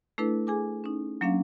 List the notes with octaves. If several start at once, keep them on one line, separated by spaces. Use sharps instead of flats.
A3 D4 E4 A4 B4
G#4 G#5 D6
C#4 D#4
F#3 A#3 C#4 D4 F5